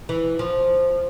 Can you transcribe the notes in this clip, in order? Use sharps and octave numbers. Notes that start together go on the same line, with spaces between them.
E3
F3